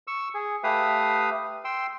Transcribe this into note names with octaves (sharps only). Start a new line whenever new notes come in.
C#6 E6
G#4
A3 G4 B4 E5 F5 D#6
G5 C6 E6